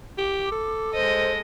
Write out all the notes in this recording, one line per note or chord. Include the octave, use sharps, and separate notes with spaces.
G4 D6
A4
G#3 C5 D#5